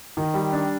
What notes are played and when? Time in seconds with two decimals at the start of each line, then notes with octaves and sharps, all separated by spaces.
0.17 D#3
0.34 G3
0.53 D4